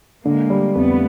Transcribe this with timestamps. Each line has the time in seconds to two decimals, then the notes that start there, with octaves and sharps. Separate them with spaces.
0.24 D3 G#3 A#3
0.50 G3
0.75 F2 A3 B3